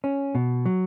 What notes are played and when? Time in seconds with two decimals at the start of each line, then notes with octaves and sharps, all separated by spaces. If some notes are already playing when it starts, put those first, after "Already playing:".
0.04 C#4
0.35 B2
0.66 F#3